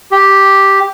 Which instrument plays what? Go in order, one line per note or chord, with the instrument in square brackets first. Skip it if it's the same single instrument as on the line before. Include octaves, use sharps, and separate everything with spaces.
[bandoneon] G4